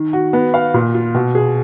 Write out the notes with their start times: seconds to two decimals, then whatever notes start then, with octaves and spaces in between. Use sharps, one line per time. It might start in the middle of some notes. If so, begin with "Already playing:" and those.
Already playing: D#3
0.13 F#4
0.33 B3
0.54 F5
0.74 A#2
0.94 F4
1.15 B2
1.35 G#4